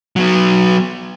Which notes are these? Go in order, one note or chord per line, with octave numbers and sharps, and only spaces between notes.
F#3 B3